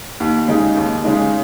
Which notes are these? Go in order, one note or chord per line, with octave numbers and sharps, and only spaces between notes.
D#2
C#3 G#3 D#4
D#2
C#3 G#3 D#4